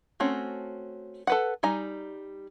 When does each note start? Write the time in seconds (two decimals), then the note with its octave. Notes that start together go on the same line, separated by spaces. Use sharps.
0.20 A3 C4 C#4 F#4
1.27 A4 B4 F#5
1.63 G3 D#4 G#5 A#5